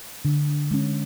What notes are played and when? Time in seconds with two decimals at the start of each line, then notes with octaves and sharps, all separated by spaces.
0.25 D3
0.71 G#3 C#4